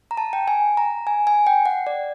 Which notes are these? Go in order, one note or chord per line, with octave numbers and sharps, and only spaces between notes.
A#5
A5
G5
G#5
A#5
G#5
G#5
G5
F#5
D5